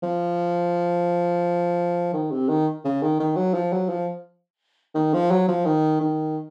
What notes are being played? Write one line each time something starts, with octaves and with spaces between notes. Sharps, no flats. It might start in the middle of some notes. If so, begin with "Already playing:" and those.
F3
D#3
C3
D#3
C#3
D#3
D#3
F#3
F3
F#3
F3
D#3
F3
F#3
F3
D#3
D#3